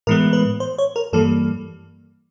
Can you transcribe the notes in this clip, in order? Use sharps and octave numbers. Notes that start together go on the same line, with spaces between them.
A2 E3 G#3 B3 A#4
B4
C5
C#5
A#4
G2 E3 G3 A#3 A4